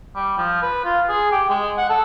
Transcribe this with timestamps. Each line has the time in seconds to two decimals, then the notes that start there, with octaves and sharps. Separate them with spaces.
0.15 G3
0.38 F3
0.62 B4
0.85 F4
1.09 G#4
1.32 G4
1.49 G#3
1.78 F#5
1.89 A4